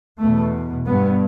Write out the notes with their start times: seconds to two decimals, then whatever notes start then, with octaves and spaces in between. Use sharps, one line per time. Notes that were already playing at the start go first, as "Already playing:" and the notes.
0.19 E2 B2 A3
0.87 G2 B3